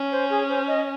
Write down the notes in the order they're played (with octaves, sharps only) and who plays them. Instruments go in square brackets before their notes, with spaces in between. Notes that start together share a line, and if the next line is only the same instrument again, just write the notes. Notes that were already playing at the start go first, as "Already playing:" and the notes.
Already playing: [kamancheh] C#4
[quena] C5
G#4
C5
D#5